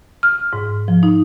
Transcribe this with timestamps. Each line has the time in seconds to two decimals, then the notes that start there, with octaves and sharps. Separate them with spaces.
0.23 F6
0.53 G#2
0.88 F3
1.03 D#4